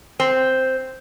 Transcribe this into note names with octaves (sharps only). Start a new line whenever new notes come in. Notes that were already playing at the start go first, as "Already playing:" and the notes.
C4